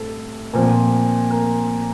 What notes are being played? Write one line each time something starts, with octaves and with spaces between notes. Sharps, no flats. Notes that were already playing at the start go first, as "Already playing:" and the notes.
Already playing: A2 G3 C4 A4
A#2 F3 C4
A#4